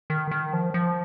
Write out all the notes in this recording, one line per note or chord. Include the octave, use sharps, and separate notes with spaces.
D#3
D#3
F3
F3